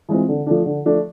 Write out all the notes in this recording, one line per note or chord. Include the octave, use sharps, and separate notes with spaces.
E3 G#3 C4 F4
D3
F3 A3 D4
D3
F3 A3 D4